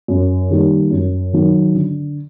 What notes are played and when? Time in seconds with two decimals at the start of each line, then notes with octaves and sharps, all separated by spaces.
0.08 F#2
0.50 D#3 G3 A#3
0.91 F#2
1.33 D#3 F#3
1.75 D3